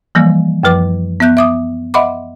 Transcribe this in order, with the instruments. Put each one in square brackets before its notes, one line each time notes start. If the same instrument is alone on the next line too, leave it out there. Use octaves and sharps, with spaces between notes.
[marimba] E3 F3 G3 A#3
F#2 F3 B4 D6
B3 E5 F#6 G6
E5 D6 D#6
D#5 E5 F#5 B5 C6 D6